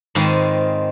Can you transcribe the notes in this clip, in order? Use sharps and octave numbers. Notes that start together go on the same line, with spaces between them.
G#2 D#3 G#3 C4 F4 B4